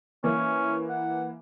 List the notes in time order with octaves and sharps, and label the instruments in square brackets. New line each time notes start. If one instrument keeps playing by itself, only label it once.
[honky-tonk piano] E3 A#3 [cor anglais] C#4
[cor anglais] F#5